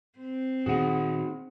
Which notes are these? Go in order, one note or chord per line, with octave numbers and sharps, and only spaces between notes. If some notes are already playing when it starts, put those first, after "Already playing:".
C4
A#2 D#3 A#3 D#4 F#4 G#4 F#5